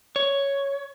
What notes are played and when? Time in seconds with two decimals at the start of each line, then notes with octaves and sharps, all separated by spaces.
0.16 C#5